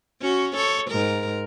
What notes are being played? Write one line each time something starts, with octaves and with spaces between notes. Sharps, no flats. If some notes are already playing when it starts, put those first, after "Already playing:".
C#4 F#4
A4 C#5
G#2 A#4